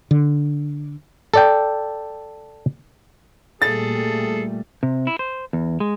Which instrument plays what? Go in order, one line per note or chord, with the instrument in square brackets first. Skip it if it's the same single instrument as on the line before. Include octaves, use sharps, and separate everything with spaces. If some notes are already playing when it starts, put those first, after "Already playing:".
[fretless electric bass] D3
[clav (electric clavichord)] A4 D5 G5
[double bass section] A#2 G3 A3 [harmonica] G#4 A4 [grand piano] A6
[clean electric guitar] C3
E4
C5
E2
G#3